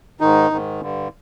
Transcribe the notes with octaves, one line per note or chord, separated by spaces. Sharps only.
G#2 D#3 D#4
G#2 D#3
G2 D3